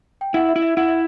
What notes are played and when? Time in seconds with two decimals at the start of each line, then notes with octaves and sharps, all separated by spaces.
0.21 G5
0.34 E4 F#5
0.49 E5
0.56 E4
0.62 E5
0.77 E4 F#5
0.89 E5